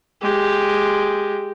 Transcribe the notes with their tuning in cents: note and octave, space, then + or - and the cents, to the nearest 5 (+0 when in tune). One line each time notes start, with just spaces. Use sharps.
G#3 +0 G4 +0